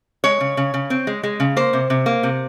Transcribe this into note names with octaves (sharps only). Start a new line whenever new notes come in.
G#3 C#5
C#3
C#3
C#3
C4
G#3
G#3
C#3
A#3 C5
C3
C3
A#3
C3